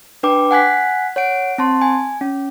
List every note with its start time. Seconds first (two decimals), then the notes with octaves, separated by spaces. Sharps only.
0.23 D4 B4 G5 D6
0.51 F#5 G#5 F#6 B6
1.16 C#5 F#5 D7
1.58 C4 A5 C6
1.81 G#5
2.21 C#4